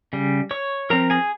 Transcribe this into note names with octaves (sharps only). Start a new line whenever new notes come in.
C#3 G3
C#5 C#6
F3 C4 A#4 A#5
G#4 G#5